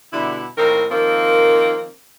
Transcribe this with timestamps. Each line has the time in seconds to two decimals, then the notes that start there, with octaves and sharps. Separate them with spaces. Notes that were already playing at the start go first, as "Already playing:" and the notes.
0.13 B2 D3 G3 E4
0.58 A2 D#3 A#3 C4 D#4 A#4
0.91 D#3 F3 A#3 C4